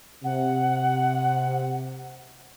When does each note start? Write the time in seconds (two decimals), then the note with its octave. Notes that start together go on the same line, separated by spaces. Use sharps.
0.24 C3 F#5